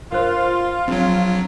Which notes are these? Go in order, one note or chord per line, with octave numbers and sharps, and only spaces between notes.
G2 F4 A#4 C5
A#1 F#3 C4